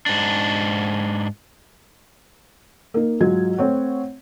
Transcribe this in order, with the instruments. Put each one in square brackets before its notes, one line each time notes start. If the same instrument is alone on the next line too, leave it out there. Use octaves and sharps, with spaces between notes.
[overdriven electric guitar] G#2 D4
[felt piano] A#3 D#4
G#2 F#3 G#3 F4 G#6
A3 C4 C#5 F#5